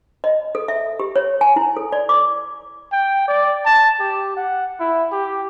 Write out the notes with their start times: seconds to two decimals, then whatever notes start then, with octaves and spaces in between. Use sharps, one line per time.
0.24 D#5
0.55 A4
0.68 E5
0.99 G4
1.16 C#5
1.41 G#5
1.56 E4
1.77 A4
1.92 D5
2.09 D6
2.92 G5
3.28 D5
3.65 A5
4.00 G4
4.37 F#5
4.80 E4
5.12 G4